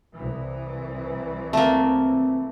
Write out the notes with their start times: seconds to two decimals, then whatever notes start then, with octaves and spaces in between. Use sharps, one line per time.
0.13 C2 E3
1.53 A3 A#3 C4